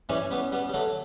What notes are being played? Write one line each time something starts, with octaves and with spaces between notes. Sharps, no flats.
E3 G3 C#4
G3 B3
G3 B3
G3
F#3 A3